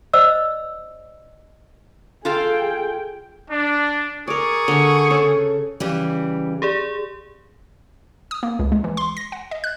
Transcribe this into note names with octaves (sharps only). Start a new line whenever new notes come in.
C5 D5 D#5 E6
F4 G#4 A4 F5 G5
D4
G#4 A#4 D5 C#6
D3 G#5
C#3 A4
C#3 E3 G3
G4 G#4 D5
D#6
A#3
C#2
G#3
E3
C6
A#6
F#5
D#5
F#6